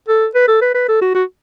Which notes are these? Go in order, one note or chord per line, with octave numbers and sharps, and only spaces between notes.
A4
B4
A4
B4
B4
A4
F#4
F#4